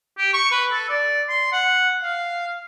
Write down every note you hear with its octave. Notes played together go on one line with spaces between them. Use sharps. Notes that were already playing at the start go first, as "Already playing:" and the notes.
G4
C#6
B4
A4
D5
C6
F#5
F5